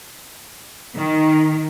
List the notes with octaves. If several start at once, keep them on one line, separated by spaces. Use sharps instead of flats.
D#3